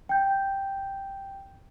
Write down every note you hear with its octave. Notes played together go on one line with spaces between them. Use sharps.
G5 G6